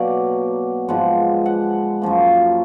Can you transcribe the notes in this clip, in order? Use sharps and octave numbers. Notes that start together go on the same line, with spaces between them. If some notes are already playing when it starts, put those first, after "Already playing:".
Already playing: B2 F#3 A#3 D5
G#2 F3 G#3 B3 F#5
F#5
F#2 F3 A#3